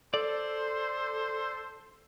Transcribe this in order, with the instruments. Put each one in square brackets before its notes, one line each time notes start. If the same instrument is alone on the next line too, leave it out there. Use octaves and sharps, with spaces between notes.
[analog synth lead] A4 [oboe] C5 [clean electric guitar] D5